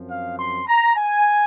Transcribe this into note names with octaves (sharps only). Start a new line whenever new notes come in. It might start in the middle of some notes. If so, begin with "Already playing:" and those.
Already playing: F#2 F3 C4
F5
C6
A#5
G#5